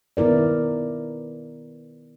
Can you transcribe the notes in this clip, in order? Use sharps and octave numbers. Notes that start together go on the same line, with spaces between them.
D#3 B3 E4 A#4 D5